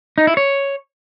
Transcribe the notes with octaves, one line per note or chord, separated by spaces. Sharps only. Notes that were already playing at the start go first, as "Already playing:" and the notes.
D#4
E4
C#5